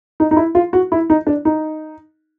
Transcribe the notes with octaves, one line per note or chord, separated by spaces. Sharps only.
D#4
D#4
E4
F4
F#4
E4
D#4
D4
D#4